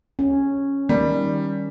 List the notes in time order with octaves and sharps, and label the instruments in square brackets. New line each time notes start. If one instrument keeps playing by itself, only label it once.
[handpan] C#4
[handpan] D#3 [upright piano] G3